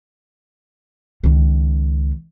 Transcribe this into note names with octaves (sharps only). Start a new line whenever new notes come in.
C#2 D#3